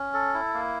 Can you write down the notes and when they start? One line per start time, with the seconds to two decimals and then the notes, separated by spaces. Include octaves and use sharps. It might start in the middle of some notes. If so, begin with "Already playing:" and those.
Already playing: C#4
0.14 A4
0.34 E4
0.54 A#3